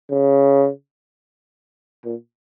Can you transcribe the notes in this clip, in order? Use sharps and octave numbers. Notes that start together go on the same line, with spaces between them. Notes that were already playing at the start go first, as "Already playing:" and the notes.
C#3
A#2